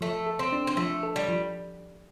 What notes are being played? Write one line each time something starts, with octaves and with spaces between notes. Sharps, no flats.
F3 A3
A4
C4
D4
C4
F3 A3
A4
G3
F3